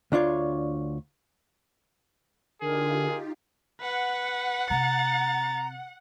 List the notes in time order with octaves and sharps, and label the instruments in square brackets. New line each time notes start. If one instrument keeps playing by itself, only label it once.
[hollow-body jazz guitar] D2 D4 F4 C#5
[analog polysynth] D3 [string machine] D#4 F4 G4 [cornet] G#4 [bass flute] A#4
[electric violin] B4 [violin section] F#5
[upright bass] C3 [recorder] A#5 [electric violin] A6